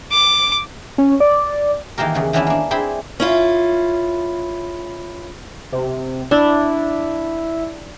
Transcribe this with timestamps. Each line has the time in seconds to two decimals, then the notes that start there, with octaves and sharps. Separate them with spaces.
0.12 D6
0.98 C#4
1.20 D5
1.98 D#3 E3 A#3 G4 A#4
2.14 E2 C#3 F#5
2.33 D#3 E3 B3 C#4 D4 E4
2.47 A#3 D4
2.71 C4 D4 E4 G#4 G5 B5
3.20 C#4 E4 F4
5.72 C3
6.31 D4 E4